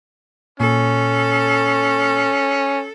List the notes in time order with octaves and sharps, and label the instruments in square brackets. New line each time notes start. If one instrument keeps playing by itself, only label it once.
[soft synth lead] A#2 [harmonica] C#4 [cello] A4